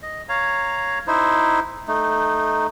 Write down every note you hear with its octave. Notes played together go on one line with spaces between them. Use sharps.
D#5
C#5 F5 A#5
D#4 E4 C5
A3 D#4